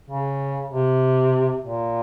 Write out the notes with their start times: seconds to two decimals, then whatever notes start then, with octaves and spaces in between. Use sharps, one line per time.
0.10 C#3
0.71 C3
1.64 A#2